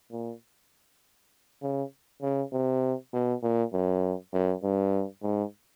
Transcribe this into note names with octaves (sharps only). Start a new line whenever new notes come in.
A#2
C#3
C#3
C3
B2
A#2
F#2
F#2
G2
G#2